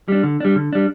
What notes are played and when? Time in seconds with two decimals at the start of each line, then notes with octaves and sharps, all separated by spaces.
0.08 G3 D4
0.23 D3
0.40 G3 D4
0.56 D3
0.73 G3 D4